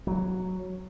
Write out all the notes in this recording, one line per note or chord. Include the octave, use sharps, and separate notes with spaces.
F#3